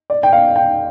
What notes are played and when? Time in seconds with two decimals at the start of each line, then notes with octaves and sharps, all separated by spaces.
0.10 D5
0.23 G5
0.33 F5
0.56 G5